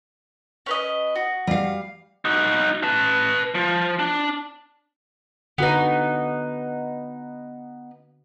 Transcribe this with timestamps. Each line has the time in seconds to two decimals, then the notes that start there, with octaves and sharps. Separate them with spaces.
0.66 C#4 B4 D#5
1.15 F#4
1.47 G3 F5
2.25 D#4 F#4
2.83 B4 A5
3.55 F3
3.99 D4
5.58 D3 B3 D#4 F#4 B4